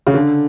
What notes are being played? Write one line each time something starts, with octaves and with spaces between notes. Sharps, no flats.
C#3
D3